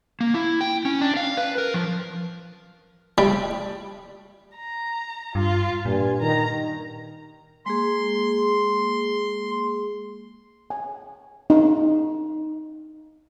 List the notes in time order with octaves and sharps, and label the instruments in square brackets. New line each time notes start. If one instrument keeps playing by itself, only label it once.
[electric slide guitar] A#3
E4
G5
C#4
D4
F5
B4
A#4
F3
[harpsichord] G3
[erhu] A#5
[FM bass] G2 [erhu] F4
[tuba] G2 [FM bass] A#2 [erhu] G#5
[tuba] D#3 [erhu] A#5
[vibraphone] G#3 A#3 G#4 [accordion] C6
[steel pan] G#5
D#4